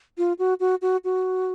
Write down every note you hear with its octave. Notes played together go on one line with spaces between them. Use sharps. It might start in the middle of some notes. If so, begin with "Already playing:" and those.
F4
F#4
F#4
F#4
F#4